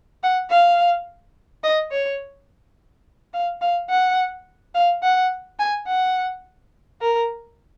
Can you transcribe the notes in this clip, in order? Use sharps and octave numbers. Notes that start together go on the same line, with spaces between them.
F#5
F5
D#5
C#5
F5
F5
F#5
F5
F#5
G#5
F#5
A#4